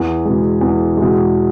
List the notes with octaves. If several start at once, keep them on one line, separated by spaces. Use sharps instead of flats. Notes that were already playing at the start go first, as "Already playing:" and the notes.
Already playing: E2
B2 G#3
E2
B2 G#3